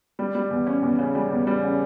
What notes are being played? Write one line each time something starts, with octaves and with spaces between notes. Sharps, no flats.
G3
G3
E2
C#4
E2
C#3
G3
E2
G3
C#3